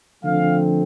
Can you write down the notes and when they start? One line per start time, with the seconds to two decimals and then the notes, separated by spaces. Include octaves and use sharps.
0.24 D3 F3 A3 C4 F5